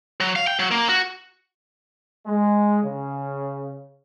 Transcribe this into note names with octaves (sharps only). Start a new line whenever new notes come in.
F#3
F5
G5
F#3
A#3
F#4
G#3
C#3